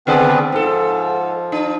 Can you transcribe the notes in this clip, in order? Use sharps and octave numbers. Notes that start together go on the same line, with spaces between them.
C#3 B3 C4 G#4 B4 D5
G#2 F3 A4
D4